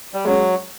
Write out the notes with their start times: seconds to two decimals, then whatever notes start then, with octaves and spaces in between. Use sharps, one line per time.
0.14 G3
0.25 F#3 G#3 C#4